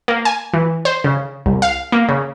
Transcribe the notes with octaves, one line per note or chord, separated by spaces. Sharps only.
A#3
G#5
E3
C5
C#3
C2
F5
A#3
C#3